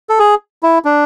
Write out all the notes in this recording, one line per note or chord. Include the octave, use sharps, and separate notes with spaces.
A4
G#4
E4
D4